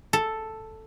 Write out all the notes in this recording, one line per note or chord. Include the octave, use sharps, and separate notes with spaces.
A4